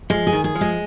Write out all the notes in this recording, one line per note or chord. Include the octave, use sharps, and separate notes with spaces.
F3 G#3
G#4
D#3
G#4
F3
G#3